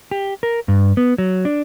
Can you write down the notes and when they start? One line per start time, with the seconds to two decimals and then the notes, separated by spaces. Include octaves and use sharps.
0.11 G4
0.43 A#4
0.68 G2
0.97 B3
1.18 F#3
1.45 D4